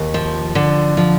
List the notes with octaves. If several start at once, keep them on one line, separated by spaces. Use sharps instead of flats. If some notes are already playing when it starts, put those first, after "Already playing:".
Already playing: D#2
F3
D3
F3